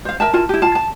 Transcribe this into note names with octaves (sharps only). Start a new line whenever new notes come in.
C5 F5
A#4 E5 A5
E4 F4 A#4 A5
E4 G4
F4 F5 A5
A5